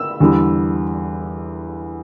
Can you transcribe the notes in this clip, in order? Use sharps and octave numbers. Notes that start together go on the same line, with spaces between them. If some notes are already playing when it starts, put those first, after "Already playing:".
Already playing: E6
E2 D3 G3